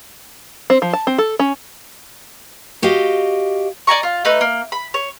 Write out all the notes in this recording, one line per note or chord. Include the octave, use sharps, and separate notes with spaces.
C4
F3
A5
C4
A4
C#4
F#4 G4 D#5 F5
D5 G#5 A#5 C#6
F4
A3 D#4 B4
A#3
B5
C#5